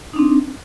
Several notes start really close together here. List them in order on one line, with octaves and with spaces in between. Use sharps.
D#4 D4 C4